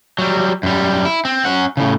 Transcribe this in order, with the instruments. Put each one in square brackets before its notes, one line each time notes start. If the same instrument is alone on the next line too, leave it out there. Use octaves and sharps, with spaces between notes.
[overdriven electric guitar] F#3 G3
F#2 G3
E4
C4
C#4 F#5
A2 C#3